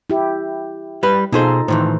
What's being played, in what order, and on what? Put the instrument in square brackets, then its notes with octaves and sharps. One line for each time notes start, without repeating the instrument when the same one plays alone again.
[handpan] E4 G4
[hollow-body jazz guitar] G3 B4
[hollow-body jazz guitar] B2 G#4 C5 [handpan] D#4 F4 A4
[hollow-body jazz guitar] A2 D#3 E3 [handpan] C5